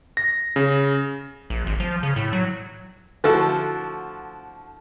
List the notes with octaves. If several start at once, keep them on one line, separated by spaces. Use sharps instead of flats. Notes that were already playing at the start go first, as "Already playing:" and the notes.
A#6
C#3
A#1
G#1
F3
C#3
A2
F#3
D3 F3 A3 E4 F#4 A4